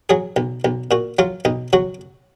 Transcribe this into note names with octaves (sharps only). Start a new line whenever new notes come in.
F#3 G#4
B1
B1
A#2 F#4
F#3 F4
B1 D#4
F#3 F#4